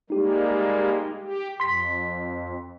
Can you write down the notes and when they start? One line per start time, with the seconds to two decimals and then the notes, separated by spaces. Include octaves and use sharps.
0.10 G3 G#3 A#3 D#4 G4
1.21 G4
1.60 F2 C6 B6